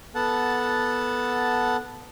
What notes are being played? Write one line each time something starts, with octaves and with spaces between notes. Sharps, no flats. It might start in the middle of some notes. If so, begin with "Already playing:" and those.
B3 A4 F#5 A5